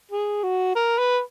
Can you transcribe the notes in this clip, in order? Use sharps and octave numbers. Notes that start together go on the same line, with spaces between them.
G#4
F#4
A#4
B4